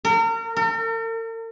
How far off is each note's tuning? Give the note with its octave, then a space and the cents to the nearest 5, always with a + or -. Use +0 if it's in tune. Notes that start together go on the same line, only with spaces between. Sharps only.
A#4 -35
A#4 -45